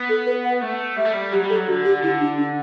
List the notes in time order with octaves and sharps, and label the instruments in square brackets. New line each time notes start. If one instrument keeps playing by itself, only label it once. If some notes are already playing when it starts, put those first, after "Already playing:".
Already playing: [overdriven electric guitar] B3
[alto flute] A4
B4
F#5
[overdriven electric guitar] A3
[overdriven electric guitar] G3 [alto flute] E5
[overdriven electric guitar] A3
G3
[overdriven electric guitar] F#3 [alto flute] G4
[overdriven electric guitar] G3
[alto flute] A4
[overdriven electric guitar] F#3
[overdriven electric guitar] D3 [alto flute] F#4
[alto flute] G4
[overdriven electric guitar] D3 [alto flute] E4
[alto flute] D4
D4